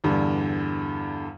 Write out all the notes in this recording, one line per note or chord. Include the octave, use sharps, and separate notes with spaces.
E2 G2 D3